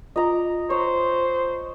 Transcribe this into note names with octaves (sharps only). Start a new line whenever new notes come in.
F4 D#5 A#5 D6
C5 C#5